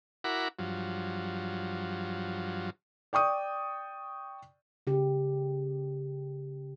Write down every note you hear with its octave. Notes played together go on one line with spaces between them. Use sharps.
E4 F#4 A#4 F#5 B5 D6
G2 F3 F#3
D5 G5 C#6 D#6
C#3 G4